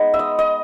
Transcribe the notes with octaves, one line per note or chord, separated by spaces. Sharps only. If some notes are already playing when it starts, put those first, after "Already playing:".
Already playing: G#3 B3 D#4
E5
D#5
D#5